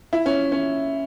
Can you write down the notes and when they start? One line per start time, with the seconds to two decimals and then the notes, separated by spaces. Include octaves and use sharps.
0.13 E4
0.26 C#4
0.52 C#4